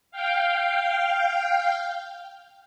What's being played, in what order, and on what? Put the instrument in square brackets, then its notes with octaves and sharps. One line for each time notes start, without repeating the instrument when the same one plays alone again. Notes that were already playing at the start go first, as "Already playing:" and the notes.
[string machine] F5 G5